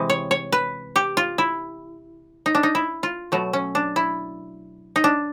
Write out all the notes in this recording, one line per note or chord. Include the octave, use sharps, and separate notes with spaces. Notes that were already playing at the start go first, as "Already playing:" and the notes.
Already playing: C3 E3 G#3
C#5
C#5
B4
G4
F4
E4
D#4
D4
D#4
E4
F4
B2 F#3 A3
C#4
D4
E4
D#4
D4